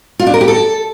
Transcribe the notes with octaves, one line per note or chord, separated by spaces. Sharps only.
F4
D4
A#4
G4
A4